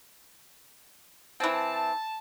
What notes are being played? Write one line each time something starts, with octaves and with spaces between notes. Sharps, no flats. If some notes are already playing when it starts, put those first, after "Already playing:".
E3 C4 A5